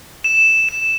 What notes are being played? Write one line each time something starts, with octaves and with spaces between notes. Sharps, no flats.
E7
E7